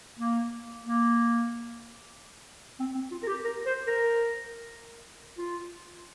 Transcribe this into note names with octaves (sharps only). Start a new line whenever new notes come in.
A#3
A#3
C4
C4
F4
A#4
G4
A#4
C5
A#4
F4